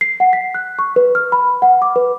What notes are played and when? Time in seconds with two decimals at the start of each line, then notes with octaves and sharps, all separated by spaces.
0.01 C7
0.20 F#5
0.33 B6
0.55 F#6
0.79 C#6
0.96 B4
1.15 F6
1.32 B5
1.62 F#5
1.82 D6
1.96 B4